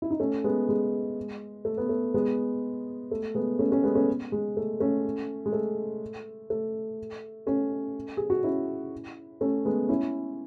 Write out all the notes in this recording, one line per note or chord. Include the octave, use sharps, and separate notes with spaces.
E4
D#4
A3 C#4
G#3 B3
G#3
A3
B3
A3
G#3 B3
A3
G#3 B3
A3 C#4
A3 C#4
G#3 B3
A3 C#4
G#3
A3
A3 C#4
G#3
A3
A3
A3 C#4
G#4
F#4
C#4 E4
A3 C#4
G#3 B3
C#4 E4